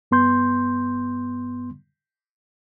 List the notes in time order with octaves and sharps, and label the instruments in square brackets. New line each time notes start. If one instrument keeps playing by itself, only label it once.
[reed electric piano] G2 B3 C6 G6